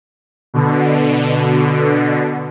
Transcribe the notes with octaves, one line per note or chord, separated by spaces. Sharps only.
B2 D3